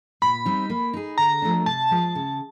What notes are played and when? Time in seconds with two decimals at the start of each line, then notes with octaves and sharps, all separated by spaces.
0.22 A#2 B5
0.45 G3 C4 D#4
0.70 A#3
0.93 D#4 G#4
1.18 D3 A#5
1.42 F3 A3 D4
1.66 C3 A5
1.91 F3 G#3
2.15 C#3